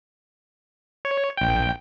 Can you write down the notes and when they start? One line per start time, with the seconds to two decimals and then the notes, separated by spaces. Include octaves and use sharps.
1.05 C#5
1.37 A#1 G5